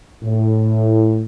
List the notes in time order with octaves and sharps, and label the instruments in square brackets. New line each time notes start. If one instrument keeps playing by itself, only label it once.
[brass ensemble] A2